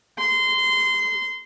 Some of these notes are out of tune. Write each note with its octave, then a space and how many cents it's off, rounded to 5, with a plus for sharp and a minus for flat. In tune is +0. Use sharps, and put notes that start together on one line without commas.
C6 -20